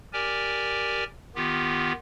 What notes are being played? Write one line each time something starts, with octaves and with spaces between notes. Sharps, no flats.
G4 A#4 D5 G#5
D#3 B3 F4 G4